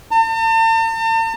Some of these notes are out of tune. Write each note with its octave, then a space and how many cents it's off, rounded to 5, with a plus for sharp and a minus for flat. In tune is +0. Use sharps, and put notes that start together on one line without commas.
A5 +45